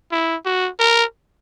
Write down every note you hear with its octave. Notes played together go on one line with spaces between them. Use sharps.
E4
F#4
A#4